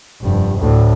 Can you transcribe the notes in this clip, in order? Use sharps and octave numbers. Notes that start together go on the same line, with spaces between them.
F1 G2
D2 A2